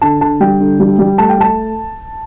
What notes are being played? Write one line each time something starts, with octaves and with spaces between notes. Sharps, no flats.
D3 A5
D3 A5
G3 G5
D3
G3
G3
A3 A5
G5
A3 A5